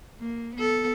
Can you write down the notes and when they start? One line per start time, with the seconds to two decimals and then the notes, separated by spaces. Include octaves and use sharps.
0.20 A#3
0.55 B3 A4